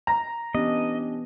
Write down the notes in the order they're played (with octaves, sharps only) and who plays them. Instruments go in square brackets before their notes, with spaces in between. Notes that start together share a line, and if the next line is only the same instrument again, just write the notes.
[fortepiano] A#5
[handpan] E3 B3 [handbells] C#4 D4 G4 [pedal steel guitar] D#5